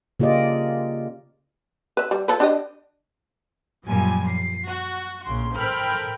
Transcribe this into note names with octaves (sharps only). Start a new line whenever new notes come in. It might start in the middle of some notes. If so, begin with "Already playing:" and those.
C#3 A#3 F4 G4 D5 D#5
B4 E5
G3
F3 A4 B4
D4 G4 D#5
F#2 A#2 F3 G3 G#5
C7
F#4
A#1 C#3 C6
A4 A#4 C5 G5 B5 F6